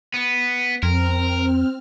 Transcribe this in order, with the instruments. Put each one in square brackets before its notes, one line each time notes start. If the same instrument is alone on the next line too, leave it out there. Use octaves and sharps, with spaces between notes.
[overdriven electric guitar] B3
[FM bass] F2 [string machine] C4 F6 [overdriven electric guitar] A#4